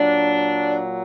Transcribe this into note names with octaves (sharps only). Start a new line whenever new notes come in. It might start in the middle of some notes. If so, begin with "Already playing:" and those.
Already playing: A#2 F#3 D4